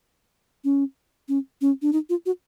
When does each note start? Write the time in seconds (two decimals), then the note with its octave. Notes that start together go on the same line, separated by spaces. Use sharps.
0.64 C#4
1.28 C#4
1.61 C#4
1.82 D4
1.93 D#4
2.10 F4
2.26 F#4